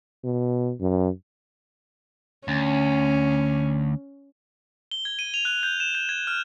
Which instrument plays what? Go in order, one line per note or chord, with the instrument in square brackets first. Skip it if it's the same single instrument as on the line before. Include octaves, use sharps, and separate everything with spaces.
[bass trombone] B2
F#2
[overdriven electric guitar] D2 [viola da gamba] C#4
[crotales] G7
G#6
D#7
F7
F#6
G6
E7
G6
G#6
F6